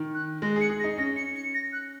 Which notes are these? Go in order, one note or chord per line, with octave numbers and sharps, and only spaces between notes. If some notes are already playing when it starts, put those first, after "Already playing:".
Already playing: D#3
F#6
G#3 A#6
G#4
C#7
G#4
A#6
D#4
C#4 A#6
C#7
C#7
A#6
F#6